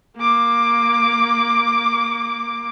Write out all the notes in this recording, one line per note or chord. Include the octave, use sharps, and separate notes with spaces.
A#3 D6